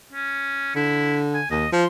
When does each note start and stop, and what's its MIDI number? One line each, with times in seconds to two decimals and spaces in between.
0.12 0.74 61
0.76 1.41 50
0.76 1.18 64
1.34 1.48 80
1.51 1.67 39
1.51 1.72 75
1.73 1.86 53
1.73 1.87 84